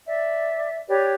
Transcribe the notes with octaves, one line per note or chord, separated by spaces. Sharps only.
D5 E5
G4 B4 C#5 D5